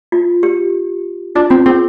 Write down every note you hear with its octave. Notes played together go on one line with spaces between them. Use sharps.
F4
G4
D4 F4
C4 F4
C4 G#4